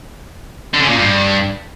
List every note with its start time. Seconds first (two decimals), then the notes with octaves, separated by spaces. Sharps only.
0.74 D3
0.82 C#3
0.89 A#2
0.97 G2